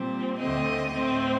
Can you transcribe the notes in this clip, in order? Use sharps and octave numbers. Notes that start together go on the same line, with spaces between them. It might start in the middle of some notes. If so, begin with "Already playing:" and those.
Already playing: A#2 G3 C4
D2 D3 A3 C4 D#5
A2 A3 C4